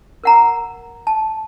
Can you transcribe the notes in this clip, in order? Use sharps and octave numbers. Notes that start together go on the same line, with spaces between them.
A#4 F#5 A#5
A5